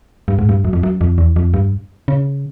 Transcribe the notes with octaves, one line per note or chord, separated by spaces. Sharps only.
G2
G#2
G2
F#2
F2
F#2
F2
E2
F2
G2
C#3